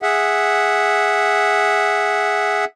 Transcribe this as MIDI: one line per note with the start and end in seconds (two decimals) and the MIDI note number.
0.02 2.65 68
0.02 2.65 76
0.02 2.65 78